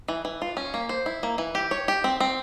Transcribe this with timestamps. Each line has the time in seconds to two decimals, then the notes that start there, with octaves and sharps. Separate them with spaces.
0.08 E3
0.25 E3
0.42 F4
0.57 C#4
0.74 A#3
0.89 C5
1.06 E4
1.23 A#3
1.38 E3
1.55 G4
1.71 C#5
1.88 G4
2.04 C4
2.20 C4